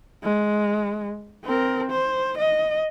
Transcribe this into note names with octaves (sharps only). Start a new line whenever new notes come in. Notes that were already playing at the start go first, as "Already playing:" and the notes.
G#3
C4 A#4
C5
D#5